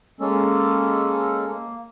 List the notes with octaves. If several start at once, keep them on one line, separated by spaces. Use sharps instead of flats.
G#3 A#3 C#4 A4
A#3